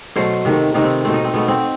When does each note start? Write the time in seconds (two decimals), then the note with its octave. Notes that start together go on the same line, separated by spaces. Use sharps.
0.16 B2 F#3 A3 C5
0.45 C3 D#3 A3
0.74 C3 D#3 A3 D#4
0.84 C4
1.04 B2 A3 C4
1.14 D#4
1.24 C4
1.34 B2 A3 B3
1.48 C4